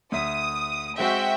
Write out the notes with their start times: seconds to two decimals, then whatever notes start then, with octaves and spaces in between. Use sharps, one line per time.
0.12 D2 E5 D#6
0.99 G#3 C4 F#4 E5 G5